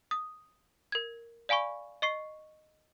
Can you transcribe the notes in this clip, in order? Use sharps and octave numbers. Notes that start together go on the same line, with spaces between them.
D#6
A#4 G#6
D5 F5 G#5 B5 C#6
D#5 C#6 C7